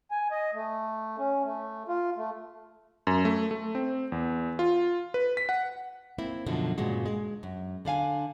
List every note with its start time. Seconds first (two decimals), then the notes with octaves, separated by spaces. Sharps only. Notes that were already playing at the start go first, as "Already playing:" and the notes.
0.11 G#5
0.31 D#5
0.54 A3
1.18 C#4
1.44 A3
1.88 F4
2.16 A3
3.07 F#2
3.25 A3
3.51 A3
3.75 C4
4.12 E2
4.59 F4
5.14 B4
5.37 B6
5.49 F#5
6.18 A#3 C4 E4
6.46 F#2 B2 D3 F3
6.78 G2 A#2 C#3 G#3 F#4
7.06 G#3
7.43 F#2
7.85 D3 D4 F5 G#5